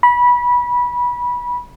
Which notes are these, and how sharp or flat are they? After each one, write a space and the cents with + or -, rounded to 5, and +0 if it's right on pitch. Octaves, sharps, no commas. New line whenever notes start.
B5 -20